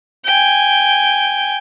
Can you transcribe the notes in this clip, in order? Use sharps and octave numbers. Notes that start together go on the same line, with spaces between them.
G5 G#5